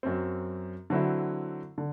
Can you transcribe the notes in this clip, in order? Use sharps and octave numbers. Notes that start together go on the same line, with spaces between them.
F#2 F#3 C4
D3 F#3 C4 E4
D3